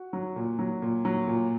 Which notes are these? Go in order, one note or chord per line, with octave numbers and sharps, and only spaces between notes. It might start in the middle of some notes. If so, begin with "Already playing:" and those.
Already playing: F#4
F#3
A#2
F#3
A#2
F#3
A#2